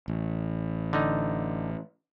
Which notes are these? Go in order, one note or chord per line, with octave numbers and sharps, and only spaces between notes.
A1
D3 D#4